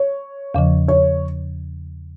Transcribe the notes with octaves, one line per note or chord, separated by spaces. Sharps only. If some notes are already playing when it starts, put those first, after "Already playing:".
Already playing: C#5
E2 C#3 F3
C#5